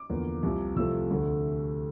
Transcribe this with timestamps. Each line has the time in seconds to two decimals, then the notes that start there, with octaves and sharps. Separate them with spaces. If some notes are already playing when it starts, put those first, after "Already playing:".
Already playing: D6
0.09 E2 D3 F3 A#3
0.43 C2 C3 F3
0.76 C2 C3 F3 A3 C4 E6
1.10 D2 D3 A3